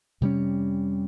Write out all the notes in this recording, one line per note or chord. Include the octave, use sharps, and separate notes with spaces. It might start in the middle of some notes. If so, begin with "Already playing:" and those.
F2 C3 G3 C#4